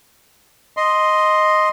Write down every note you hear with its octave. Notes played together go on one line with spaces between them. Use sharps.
D#5 C6